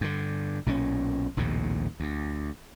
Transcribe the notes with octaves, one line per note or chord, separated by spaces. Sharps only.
G2 D3
B1 A#2 D#3 C#4
A#1 D#2 A2 C3
D2